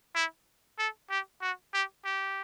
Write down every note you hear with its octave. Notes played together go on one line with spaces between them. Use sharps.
E4
A4
G4
F#4
G4
G4